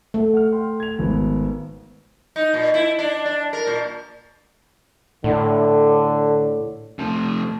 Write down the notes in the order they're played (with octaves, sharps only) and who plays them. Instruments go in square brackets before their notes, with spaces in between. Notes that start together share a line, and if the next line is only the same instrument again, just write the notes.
[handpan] A3
[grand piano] F#5 F6
F#5 G5 C6
G#6 F7
G#1 B3
[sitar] D#4
A#2
E4
D4
D4
A#4
A#2
[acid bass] A2 [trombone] D3
[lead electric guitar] C3 F3 [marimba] A3